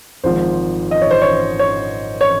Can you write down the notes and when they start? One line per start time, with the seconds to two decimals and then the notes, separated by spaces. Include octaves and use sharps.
0.24 G#1 G#2 F3 C5
0.91 D#5
1.02 C#5
1.11 C5
1.22 C#5
1.59 C#5
2.21 C#5